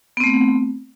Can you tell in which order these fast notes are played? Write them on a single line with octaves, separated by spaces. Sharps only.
B3 C4 A3